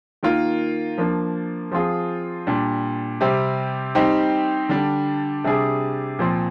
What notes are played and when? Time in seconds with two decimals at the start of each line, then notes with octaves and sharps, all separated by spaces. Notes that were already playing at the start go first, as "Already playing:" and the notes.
0.23 D#3 A#3 F4 A#4
0.98 F3 A#3 D4
1.71 F3 C4 F4 G#4
2.47 A#2 G3 D4
3.21 C3 G3 C4
3.95 G3 C4 D#4 G4
4.69 D3 G3 D4
5.44 C3 G3 D4 G#4
6.19 A#2 F3 C4